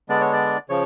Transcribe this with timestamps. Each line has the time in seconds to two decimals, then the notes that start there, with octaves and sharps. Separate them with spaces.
0.09 D3 G#3 B3 D4 D5
0.21 C#5
0.32 D5
0.69 C#3 F3 C#5